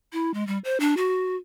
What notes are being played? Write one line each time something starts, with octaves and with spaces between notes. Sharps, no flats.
E4
G#3
G3
C5
D4
F#4